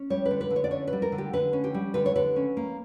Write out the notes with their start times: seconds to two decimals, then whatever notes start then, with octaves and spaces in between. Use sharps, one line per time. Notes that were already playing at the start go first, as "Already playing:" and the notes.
Already playing: C#4
0.10 G3 C#5
0.25 B4
0.31 D3
0.41 B4
0.51 D3
0.56 C#5
0.64 D5
0.71 C#4 C#5
0.87 B4
0.93 G3
1.02 A#4
1.12 D3
1.18 G4
1.33 D3 B4
1.53 C#4
1.64 G4
1.74 G3
1.94 D3 B4
2.06 C#5
2.16 D3 B4
2.36 C#4
2.57 A#3